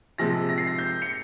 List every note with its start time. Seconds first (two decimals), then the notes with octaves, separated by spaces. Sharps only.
0.18 C3 F3 G#3 A#6
0.49 A#6
0.58 C7
0.67 A#6
0.78 G6
1.02 C#7